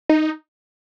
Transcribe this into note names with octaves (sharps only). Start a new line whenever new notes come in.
D#4